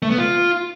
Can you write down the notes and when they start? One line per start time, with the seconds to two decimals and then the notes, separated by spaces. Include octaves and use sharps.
0.02 A3
0.10 B3
0.18 F4